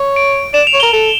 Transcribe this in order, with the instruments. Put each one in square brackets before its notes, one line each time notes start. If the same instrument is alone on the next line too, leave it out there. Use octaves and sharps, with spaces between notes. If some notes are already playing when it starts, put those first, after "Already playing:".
Already playing: [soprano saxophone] C#5
[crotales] D7
[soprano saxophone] D5 [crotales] E7
[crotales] F7
[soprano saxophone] C#5
[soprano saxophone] A#4 [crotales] G7
[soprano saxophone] A4